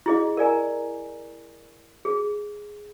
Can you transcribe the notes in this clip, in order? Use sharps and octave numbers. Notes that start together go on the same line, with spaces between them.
E4 G#4 D#5
A#4 D5 G#5 A#5
G#4